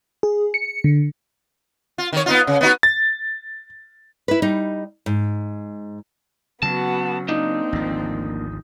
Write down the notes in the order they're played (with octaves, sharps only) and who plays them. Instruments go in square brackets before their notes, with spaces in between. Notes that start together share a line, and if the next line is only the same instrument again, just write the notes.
[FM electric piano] G#4
C#7
D3
[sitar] F4
D#3 C#5
B3 D#4 F4
C#3
B3 D#4 F#4
[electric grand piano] A6
[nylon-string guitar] E4 B4
G3 D#4
G#2
[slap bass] C#3 F#3 [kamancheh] B3 F#4 [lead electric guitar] A5
[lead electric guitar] A#3 D4 [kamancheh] C4 [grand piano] D#4
[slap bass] G#1 D2 F3